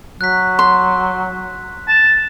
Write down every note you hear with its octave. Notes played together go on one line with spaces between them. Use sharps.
F#3 F#6 B6
C6
A5